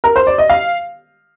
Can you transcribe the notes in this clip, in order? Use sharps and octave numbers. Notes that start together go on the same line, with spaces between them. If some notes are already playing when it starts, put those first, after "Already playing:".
A#4
C5
D5
D#5
F5